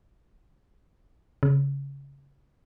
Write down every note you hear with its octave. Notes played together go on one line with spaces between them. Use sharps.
C#3